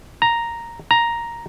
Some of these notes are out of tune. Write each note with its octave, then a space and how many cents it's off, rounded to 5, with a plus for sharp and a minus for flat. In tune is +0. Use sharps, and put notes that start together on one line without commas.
A#5 +0
A#5 +5